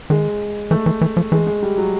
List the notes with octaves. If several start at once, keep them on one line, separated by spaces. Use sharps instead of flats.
D#3 G#3
E3 A3
E3
E3
F3
E3 G#3
G#3
G3
F#3